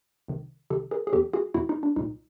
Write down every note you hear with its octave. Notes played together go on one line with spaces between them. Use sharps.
C2 C3 D#3
C2 C3 D#3 G4 A4
G#4 A#4
G#4
E2 B2 G4 A4
F#4 G#4
E2 B2 E4 F#4
D#4
D4
C2 A#2 D#4